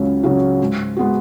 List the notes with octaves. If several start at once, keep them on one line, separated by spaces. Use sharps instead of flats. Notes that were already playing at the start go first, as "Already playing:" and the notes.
Already playing: C#2 C#3 F#3 C#4
C#3 F#3 C#4
G#2
G#3 B3 F#4